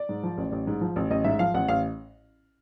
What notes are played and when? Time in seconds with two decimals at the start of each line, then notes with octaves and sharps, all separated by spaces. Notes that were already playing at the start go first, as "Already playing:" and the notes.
Already playing: D5
0.09 G#2
0.23 F3
0.38 A1
0.52 A1
0.67 G#2
0.81 F3
0.96 A1
1.11 A1 D#5
1.24 G#2 E5
1.39 F3 F5
1.54 A1 F#5
1.68 A1 F5